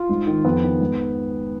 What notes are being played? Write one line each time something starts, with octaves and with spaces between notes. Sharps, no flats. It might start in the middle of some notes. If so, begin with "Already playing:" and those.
Already playing: F4
G#2
D#3
F2 B3
D#3
G#2